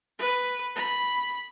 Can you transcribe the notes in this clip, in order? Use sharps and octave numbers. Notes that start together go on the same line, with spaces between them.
B4
B5